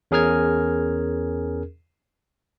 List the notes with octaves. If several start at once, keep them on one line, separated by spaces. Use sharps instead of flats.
E2 C#4 G#4 A#4 F6 G#6